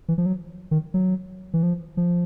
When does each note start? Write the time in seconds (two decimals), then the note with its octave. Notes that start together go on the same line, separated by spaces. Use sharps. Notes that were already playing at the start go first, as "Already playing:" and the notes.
0.08 E3
0.18 F3
0.26 F#3
0.71 D#3
0.94 F#3
1.54 E3
1.63 F3
1.97 F3